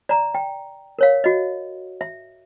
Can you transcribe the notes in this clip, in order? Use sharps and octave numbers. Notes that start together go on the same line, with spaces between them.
D5 A#5
G5
A#4 C#5 F5
F#4 D#5
E5